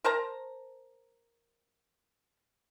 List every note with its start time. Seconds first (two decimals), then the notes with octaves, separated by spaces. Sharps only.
0.04 A#4 C5 A5 A#5